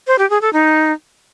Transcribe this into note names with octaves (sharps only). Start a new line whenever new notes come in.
C5
G4
G#4
A4
D#4